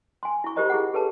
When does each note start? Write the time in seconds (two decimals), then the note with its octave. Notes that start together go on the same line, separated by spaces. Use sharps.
0.23 G#5 C6
0.44 E4 C#6
0.56 F4 G4 A#4 C5 D#5 A#5
0.70 E4 G#4 F#5
0.93 G4 A4 B4 C#5 A5